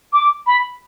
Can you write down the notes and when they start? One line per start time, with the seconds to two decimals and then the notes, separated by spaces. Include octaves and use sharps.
0.13 D6
0.47 B5